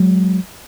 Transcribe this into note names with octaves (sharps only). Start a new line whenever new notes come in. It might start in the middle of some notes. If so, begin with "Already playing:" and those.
Already playing: F#3 G#3